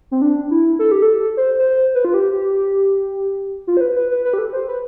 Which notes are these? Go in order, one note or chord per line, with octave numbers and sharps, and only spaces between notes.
C4
D4
E4
A4
G4
A4
C5
C5
B4
F4
G4
G4
F4
C5
B4
B4
B4
B4
G4
A4
C5
B4